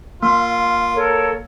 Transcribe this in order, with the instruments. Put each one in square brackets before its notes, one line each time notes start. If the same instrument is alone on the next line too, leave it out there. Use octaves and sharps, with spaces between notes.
[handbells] A#3 [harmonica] F4
[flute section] A4 A#4 C#5